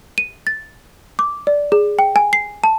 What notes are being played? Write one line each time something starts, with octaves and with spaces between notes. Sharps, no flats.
D#7
A6
D6
D5
G#4
G5
G#5
C7
A5